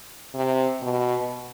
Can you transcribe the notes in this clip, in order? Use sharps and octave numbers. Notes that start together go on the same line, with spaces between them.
C3
B2